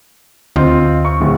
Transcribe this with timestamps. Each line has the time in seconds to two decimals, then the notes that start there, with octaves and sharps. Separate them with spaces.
0.56 D2 C4 F4 D#5
1.05 C#6
1.21 D1